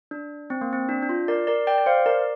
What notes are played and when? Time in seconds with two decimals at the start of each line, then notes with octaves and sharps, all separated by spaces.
0.11 D4
0.50 C4
0.61 A#3
0.73 C4
0.89 D4
1.03 D4
1.09 F4
1.28 A#4 D5
1.47 A#4 D5
1.67 D5 G5
1.78 D5
1.86 C5 F5
2.06 A#4 D5